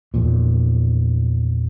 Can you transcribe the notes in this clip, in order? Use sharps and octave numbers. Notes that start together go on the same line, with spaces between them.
A#1 E2 A#2